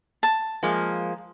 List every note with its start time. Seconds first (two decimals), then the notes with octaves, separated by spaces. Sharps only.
0.23 A5
0.63 F3 G#3 A#3